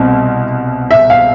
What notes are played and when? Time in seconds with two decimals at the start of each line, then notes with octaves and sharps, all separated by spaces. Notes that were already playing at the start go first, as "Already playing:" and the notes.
Already playing: C2 B2 C4
0.91 E5
1.10 F5